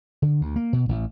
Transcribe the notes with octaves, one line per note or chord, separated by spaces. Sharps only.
D3
D2
A#3
B2
A1